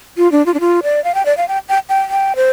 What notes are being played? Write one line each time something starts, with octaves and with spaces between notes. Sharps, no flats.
F4
D4
F4
D4
F4
D5
F5
G5
D5
F5
G5
G5
G5
G5
C5